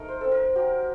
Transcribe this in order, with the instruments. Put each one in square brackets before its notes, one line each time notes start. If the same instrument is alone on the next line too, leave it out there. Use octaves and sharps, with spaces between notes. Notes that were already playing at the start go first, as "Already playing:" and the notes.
Already playing: [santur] A3 D#4 A#4
C5
C4 A4
A#4
F#3 G4